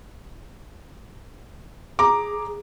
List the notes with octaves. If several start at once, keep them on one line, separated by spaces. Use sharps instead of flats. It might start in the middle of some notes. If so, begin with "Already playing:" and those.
G#4 A#5 D6